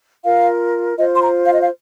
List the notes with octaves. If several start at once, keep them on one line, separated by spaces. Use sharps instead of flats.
F4 A#4 F5
F4 C5 D#5
C6
A#5
F5
D#5
F5